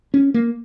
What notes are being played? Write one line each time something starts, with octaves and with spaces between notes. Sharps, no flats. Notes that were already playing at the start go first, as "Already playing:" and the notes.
C#4
A#3